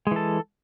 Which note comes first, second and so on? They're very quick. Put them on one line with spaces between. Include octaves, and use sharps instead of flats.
G#3 E3 A4